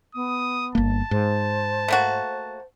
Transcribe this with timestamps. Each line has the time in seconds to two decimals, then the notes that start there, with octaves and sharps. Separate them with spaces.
0.15 B3 D#6
0.75 G1 A#3 A5
1.11 G#2 C5
1.88 A3 A#3 F#4